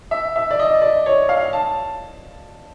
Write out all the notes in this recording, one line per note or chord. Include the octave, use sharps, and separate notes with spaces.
E5
E5
D5
D#5
D5
C#5
F5
A5